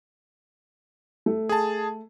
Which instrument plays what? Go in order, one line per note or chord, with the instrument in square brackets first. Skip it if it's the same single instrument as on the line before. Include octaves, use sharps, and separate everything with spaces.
[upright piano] A3
[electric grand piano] G#4 A5